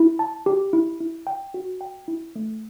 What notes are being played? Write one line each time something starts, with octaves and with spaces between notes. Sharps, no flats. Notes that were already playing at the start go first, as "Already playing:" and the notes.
Already playing: E4
A5
G4
E4
E4
G5
F#4
G5
E4
A3